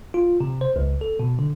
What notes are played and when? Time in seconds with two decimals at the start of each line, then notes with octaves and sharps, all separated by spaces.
0.14 F4
0.40 C3
0.61 C5
0.76 C#2
1.01 A4
1.20 B2
1.39 D3